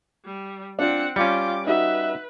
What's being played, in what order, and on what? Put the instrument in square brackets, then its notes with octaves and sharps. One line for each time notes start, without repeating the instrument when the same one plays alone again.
[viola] G3
[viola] C4 F#5 [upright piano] D4 F4
[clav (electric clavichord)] G3 C#4 [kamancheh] F4 G5 [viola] D6 [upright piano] C#7
[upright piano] D#4 F#4 [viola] B4 [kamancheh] E5